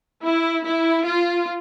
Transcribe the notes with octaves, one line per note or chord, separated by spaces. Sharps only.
E4
E4
F4